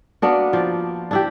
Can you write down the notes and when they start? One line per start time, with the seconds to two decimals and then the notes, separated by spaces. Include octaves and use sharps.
0.22 A#3 B3 D4 F#4
0.53 F3 D5
1.11 D4 E4 G4